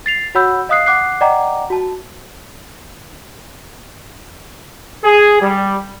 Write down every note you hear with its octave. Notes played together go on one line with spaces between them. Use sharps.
A6 C7 F7
F#4 C#5 F#5 B5 E6 G6
D#5 F5 D#6 F#6 C7
F#5 D6 F#6 C7
D5 D#5 F#5 G5 A#5 D6
F#4 A5
G#4
G3